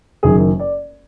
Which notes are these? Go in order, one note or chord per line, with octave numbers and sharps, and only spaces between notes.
F#1 F#2 D#3 G#4
D5